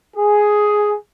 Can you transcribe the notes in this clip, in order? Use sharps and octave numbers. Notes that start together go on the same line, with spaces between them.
G#4